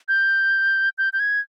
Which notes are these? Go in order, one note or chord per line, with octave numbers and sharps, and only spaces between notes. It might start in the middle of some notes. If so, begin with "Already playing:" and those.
G6
G6
G6
G#6